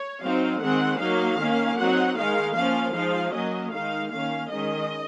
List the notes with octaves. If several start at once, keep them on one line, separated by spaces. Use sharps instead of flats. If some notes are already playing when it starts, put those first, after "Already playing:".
Already playing: C#5
F#3 C4 D#4 F5
D#3 G#3 C4 F#5
F#3 A#3 D#4 F5
D#3 A#3 C#4
F#3 C4 D#4 F#5
D#3 G#3 D#4 F5
F3 A#3 C#4 F5
F3 G#3 D#4 F5
F#3 A#3 C#4 D#5
D#3 G#3 D#4 F5
D#3 A#3 C#4 F5
D#3 G#3 C#4 D#5